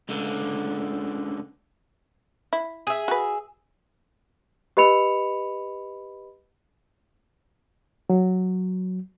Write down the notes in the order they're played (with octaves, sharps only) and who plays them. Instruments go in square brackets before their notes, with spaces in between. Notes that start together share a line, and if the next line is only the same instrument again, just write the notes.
[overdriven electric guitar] C#2 D3
[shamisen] E4
[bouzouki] G#4 E5
[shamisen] F#4 B4
[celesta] G4 B4 D#5 B5 C#7 F7
[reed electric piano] F#3